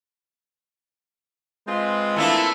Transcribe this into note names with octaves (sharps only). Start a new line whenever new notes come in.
G#3 C4 F4 B4
A3 A#3 D4 E4